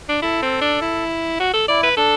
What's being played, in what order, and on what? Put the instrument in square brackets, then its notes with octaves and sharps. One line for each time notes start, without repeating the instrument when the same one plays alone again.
[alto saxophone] D4
[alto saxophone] E4 [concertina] A4
[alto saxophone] C4
D4
E4
F#4
A4
[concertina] E4 [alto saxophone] D5
[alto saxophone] B4
[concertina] D4 [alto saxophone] A4